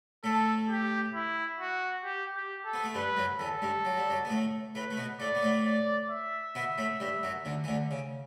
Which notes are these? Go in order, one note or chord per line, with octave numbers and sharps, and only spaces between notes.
A2 A3 A4
G4
E4
F#4
G4
G4
A4
B3
A3
G2 G3 B4
F#2 F#3
E2 E3 A4
G2 G3
F#3
G3
F#2 F#3
B3
A2 A3
A2 A3 B4
A3
B2 B3
A2 A3 D5
B3
A2 A3
D5
E5
B2 B3
A2 A3
G2 G3
F#2 F#3
D2 D3
E3
D2 D3
C#3